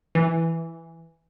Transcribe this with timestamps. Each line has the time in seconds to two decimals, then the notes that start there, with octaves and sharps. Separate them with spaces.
0.15 E3